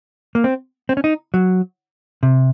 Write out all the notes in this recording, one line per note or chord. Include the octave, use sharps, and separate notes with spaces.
A#3
C4
C4
C#4
D#4
F#3
C3